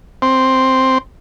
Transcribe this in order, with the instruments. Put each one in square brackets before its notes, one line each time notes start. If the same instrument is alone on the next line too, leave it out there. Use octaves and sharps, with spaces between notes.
[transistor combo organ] C4